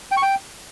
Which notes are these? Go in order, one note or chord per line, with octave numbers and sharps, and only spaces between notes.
G5
C#6
G5